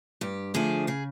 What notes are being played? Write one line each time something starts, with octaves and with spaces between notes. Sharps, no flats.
G2 G4
D3 F3 A3 D4 G#4
C#3 G#4